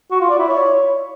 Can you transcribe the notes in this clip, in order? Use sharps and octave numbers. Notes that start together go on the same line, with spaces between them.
F#4
F4
D5
E4
C#5